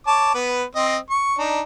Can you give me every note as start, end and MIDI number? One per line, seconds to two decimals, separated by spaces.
0.07 0.35 73
0.07 0.35 81
0.07 0.35 86
0.35 0.63 59
0.35 0.63 71
0.75 0.97 60
0.75 0.97 75
1.10 1.37 85
1.38 1.61 62
1.38 1.61 63